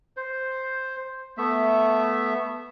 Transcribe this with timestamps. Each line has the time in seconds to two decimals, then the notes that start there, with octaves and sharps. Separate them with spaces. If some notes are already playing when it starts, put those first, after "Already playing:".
0.17 C5
1.38 A3 B3 E5